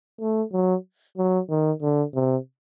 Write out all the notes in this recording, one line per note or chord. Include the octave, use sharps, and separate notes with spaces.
A3
F#3
F#3
D#3
D3
C3